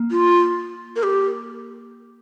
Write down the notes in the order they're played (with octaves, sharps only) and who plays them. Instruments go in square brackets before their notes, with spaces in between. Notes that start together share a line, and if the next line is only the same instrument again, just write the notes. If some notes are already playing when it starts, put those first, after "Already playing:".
Already playing: [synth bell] A#3
[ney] F4
A#4
G4